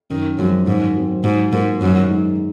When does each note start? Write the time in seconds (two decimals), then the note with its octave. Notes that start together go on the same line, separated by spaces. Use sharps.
0.10 F#2 D#3
0.38 F#2 F3 G#3 C4 F#4
0.67 G#2 D#3
0.96 F#3 C4
1.24 G#2 F#3
1.52 G#2 A#3 F4 A#4
1.81 F#2 D#3
2.09 G#3 D#4